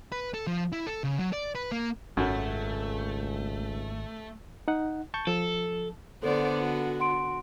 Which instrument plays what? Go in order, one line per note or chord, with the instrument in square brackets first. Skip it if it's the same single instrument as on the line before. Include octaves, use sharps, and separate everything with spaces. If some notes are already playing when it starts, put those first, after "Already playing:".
[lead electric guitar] B4
A4
F3
E4
A4
C#3
F#3
D5
B4
A#3
[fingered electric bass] G#1 [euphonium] C#2 [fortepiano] F#2 F#3 [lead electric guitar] A3
[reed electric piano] D#4 F#5
A5 C#6 G6
[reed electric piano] F3 [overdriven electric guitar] A4
[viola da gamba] D3 B3 [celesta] A4 [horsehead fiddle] C5 D5
[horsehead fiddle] F#4
[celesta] F#5 C6 D7